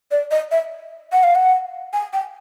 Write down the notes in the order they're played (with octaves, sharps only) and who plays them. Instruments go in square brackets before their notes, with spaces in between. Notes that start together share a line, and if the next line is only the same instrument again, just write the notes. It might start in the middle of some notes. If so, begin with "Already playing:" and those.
[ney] D5
D#5
E5
F#5
F5
F#5
G#5
G5